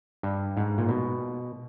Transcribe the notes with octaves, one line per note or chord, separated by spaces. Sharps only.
G2
G#2
A#2
B2